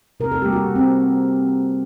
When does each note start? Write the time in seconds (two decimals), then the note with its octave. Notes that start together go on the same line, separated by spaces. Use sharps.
0.20 C3 A#4
0.32 A4
0.42 G3 G4
0.45 A#3
0.53 F#4
0.64 C3
0.75 C4